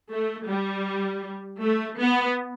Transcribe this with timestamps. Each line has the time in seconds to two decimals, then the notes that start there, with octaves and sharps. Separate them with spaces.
0.10 A3
0.48 G3
1.62 A3
2.00 B3